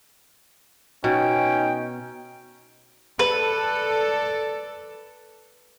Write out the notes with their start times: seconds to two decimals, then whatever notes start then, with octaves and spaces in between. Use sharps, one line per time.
1.04 B2 C#4 D#4 G5
3.19 A4 B4 D5